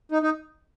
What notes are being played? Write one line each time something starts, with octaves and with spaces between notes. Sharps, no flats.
D#4
D#4